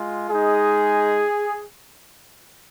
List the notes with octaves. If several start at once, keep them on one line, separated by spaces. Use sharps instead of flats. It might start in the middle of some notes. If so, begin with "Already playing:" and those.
Already playing: G#3 F4
G#3 D#4 G#4